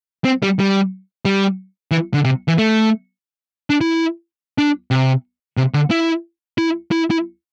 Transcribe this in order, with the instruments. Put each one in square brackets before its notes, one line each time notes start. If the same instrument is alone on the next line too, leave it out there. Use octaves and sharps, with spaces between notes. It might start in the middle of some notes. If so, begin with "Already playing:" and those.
[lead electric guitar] C4
G3
G3
G3
E3
D3
C3
E3
A3
D4
E4
D4
C3
C3
D3
E4
E4
E4
E4